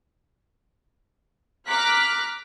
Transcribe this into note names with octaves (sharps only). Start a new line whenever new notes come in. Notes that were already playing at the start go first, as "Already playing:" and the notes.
A#5 D6 F6 F#6 B6